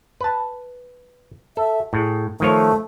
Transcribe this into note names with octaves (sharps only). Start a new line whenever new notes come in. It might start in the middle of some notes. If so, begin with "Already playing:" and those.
B4 A5
A4 E5
A2 G#4
D#3 F3 A3 C#5